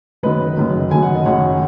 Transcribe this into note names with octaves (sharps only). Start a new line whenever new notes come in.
F#1 F#2 D#3 B4 D#5
F#1 F#2 D#3
F#1 F#2 D#3 G#5
F#5
D#5
F#1 F#2 D#3 C#5 F#5